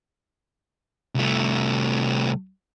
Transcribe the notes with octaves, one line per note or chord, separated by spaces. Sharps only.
C2 A3